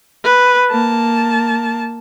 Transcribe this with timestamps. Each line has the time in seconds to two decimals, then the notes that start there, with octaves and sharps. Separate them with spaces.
0.24 B4
0.71 A#3 A5